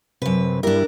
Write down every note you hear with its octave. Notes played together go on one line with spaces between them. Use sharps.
F#2 C3 B4
G2 G3 D4 E4 A#4